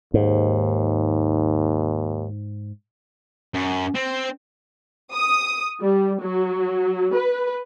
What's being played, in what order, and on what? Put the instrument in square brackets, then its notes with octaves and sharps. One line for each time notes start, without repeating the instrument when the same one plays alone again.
[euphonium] D#2 [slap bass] G#2
[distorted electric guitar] F#2
C4
[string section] D#6
G3
F#3
B4